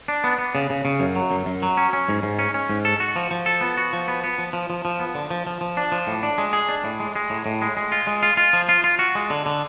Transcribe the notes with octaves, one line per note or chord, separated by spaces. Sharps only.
D4
B3
B3
C#3
C#3
C#3
F#2
F#3
F#2
F#2
F#3
C#4
C#4
G#2
G#2
C#4
C#4
G#2
A4
F#4
F3
F3
A4
B3
F#4
F3
B3
B3
F3
F3
F3
F3
B3
D3
F3
F3
F3
D4
F3
A2
D4
G#3
G#4
D4
A2
G#3
G#3
A2
A2
G#3
G#3
F4
G#3
F4
F4
F3
F4
F4
F#4
G#3
D3
D3